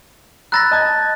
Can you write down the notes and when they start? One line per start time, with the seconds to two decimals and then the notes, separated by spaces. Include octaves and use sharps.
0.52 A#5 B5 E6 F#6 A6 A#6
0.71 D#5 A5 G#6